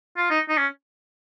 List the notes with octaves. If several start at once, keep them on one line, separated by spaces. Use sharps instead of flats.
F4
D#4
D#4
C#4